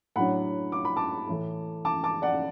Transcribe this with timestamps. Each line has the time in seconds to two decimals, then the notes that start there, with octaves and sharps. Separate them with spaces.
0.16 A2 F#3 D4 F#5 B5
0.72 D6
0.85 B5
0.96 A5 D6
1.29 A2 E3 A3
1.85 A5 D6
2.04 A5 D6
2.22 D5 F#5